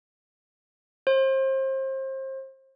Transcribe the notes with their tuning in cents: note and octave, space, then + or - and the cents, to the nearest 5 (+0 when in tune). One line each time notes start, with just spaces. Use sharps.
C5 +30